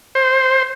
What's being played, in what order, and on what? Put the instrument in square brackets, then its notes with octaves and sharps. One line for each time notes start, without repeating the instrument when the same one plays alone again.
[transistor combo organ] C5